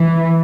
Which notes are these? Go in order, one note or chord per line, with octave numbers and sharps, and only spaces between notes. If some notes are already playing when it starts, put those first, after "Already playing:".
Already playing: E3